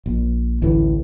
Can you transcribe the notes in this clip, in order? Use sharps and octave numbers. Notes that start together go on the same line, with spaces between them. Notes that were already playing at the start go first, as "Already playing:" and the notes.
A#1
A1 D2 A2 E3